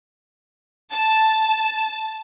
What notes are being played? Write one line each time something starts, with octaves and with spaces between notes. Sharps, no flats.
A5